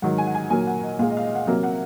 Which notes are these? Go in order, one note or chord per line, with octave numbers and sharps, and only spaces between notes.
G#2 D#3 F#3 F#5
G#5
F#5
G#5
A#2 F#3 A#3 G#5
F#5
D#5
A#2 G#3 F5
D#5
F5
D#5
F#5
C3 F#3 A#3
F#5